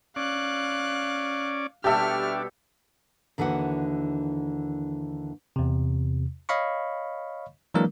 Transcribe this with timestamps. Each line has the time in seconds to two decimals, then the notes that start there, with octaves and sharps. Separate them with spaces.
0.16 C#4 D5 F5 F#6
1.84 B2 G3 D4 G4 A4 E5 C#6 F6
3.38 D#2 D3 E3 D4 F#4 F#5
5.56 E2 C3
6.49 C#5 D#5 F5 B5 C#6
7.74 E3 F#3 G#3 A#3 D4 A#4